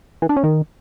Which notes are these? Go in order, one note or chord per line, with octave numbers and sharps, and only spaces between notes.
E3
D4
C#4
D#3